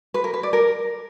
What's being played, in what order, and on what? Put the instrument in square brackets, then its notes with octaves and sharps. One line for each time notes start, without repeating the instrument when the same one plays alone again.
[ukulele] B4
A#4
B4
D5
A#4